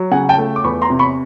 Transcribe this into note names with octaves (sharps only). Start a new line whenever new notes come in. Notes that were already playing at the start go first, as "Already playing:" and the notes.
Already playing: F#3
C#3 F#5 G#5
G5 A5
A3
D6
E2 B5 C#6
A#5 C6
C3
B5 C#6